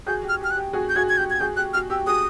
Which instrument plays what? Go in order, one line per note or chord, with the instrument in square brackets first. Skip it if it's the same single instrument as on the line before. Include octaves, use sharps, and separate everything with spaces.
[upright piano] F#4 G#4 [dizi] G6
[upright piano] G4
[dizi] F6
[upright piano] G4 [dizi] F6
[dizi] F#6
[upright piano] G4
F#4 G#4
[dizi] G6
[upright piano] F#4 G#4 [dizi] G#6
[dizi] G#6
[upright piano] G4 [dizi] G6
[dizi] G#6
[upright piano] F#4 G#4 [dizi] G6
[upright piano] G4 [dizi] F#6
[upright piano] F#4 [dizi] F6
[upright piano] G4 [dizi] E6
[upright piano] F#4 G#4 [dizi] D#6